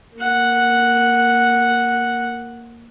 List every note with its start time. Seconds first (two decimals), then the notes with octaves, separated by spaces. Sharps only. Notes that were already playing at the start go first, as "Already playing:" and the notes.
0.17 A#3 F#5